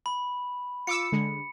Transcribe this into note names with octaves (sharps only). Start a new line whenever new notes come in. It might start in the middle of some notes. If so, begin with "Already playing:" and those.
B5
F4 D6 E6 C#7
D3 G#3